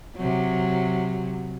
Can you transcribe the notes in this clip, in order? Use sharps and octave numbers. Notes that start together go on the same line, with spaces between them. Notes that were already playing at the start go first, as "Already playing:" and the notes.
C3 F#3